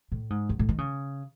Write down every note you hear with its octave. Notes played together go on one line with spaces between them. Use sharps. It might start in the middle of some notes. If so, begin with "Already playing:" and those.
A2
G#2
F#2
A2
D#3
C#3